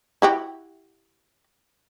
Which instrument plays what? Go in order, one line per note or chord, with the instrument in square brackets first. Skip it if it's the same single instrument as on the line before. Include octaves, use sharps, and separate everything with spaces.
[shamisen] E4 F#4 G4